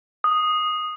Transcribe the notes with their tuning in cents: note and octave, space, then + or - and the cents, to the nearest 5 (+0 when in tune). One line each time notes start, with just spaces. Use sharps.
D#6 -5